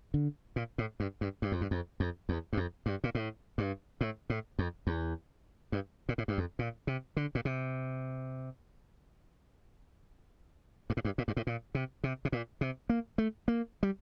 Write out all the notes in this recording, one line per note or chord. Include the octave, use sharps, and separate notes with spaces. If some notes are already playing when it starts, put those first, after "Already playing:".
D3
A#2
A2
G2
G2
G2
F2
G2
F2
F2
E2
G2
F2
G2
A#2
A2
G2
A2
A2
F2
E2
G2
A#2
A2
G2
F2
A#2
C3
D3
A#2
C3
G2
A2
G2
A#2
G2
A2
A#2
C3
C3
C3
A#2
C3
A#3
A3
A#3
G3